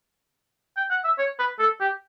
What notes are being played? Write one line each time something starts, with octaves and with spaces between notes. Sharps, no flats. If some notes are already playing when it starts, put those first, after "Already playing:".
G5
F#5
E5
C#5
B4
A4
G4